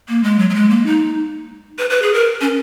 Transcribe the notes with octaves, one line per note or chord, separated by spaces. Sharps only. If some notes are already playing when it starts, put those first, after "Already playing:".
A#3
G#3
F#3
F#3
G#3
A#3
D#4
B4
B4
G#4
A#4
C#4